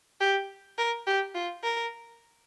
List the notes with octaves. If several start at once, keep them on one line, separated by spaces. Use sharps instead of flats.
G4
A#4
G4
F4
A#4